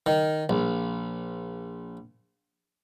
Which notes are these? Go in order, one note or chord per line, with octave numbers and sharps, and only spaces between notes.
D#3
A#1